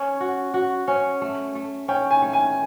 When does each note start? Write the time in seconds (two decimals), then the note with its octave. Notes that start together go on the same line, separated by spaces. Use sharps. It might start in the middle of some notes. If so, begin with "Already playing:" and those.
Already playing: C#4 G#5
0.20 F#4
0.54 F#4
0.88 C#4
1.21 A3
1.55 A3
1.88 C#4 G5
2.11 G#5
2.22 A3
2.33 G#5